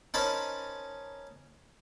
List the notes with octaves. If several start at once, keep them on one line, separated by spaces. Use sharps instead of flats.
C#4 D#4 A#4 C5 A5 B5